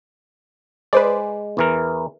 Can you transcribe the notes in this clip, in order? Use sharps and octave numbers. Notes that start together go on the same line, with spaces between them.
G#3 B4 C5 D5
E2 E3 A#4